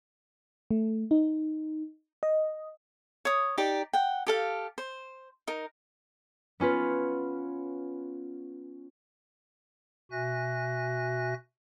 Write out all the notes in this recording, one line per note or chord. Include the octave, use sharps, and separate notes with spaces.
A3
D#4
D#5
C#5 D#6
D#4 G4 D5
F#5 G5
G4 A4 F5
C5
D#4 A#4
B3 C#4 F4 B4
B2 F#4 E5 G#5 F#6 A#6